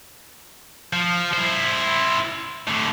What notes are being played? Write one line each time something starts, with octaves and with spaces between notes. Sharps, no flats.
F3
E4 C5
A2 D3